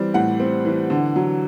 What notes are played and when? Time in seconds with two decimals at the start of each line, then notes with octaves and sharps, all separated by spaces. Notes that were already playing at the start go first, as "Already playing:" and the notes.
Already playing: E3 G3 C4
0.14 A2 F#5
0.40 C4
0.65 E3
0.90 D3
1.16 F#3